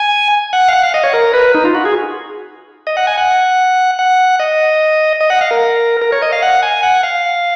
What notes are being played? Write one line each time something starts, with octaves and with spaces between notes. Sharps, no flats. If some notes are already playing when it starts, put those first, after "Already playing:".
Already playing: G#5
F#5
F5
F#5
F5
D#5
C#5
A#4
B4
D#4
F4
F#4
G#4
D#5
F#5
G#5
F#5
F#5
D#5
D#5
F#5
F5
A#4
A#4
C#5
D#5
F5
F#5
G#5
F#5
F5